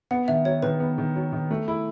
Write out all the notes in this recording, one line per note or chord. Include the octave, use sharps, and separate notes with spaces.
B3 F#5
D#3 E5
F#3 C#5
D#3 B4
B3
D#3
F#3
D#3
A3
E4